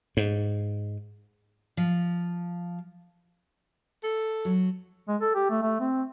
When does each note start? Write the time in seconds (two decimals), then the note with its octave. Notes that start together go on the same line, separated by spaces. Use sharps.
0.17 G#2
1.77 F3
4.03 A4
4.45 F#3
5.08 G#3
5.21 A4
5.35 G4
5.50 A3
5.62 A3
5.80 C4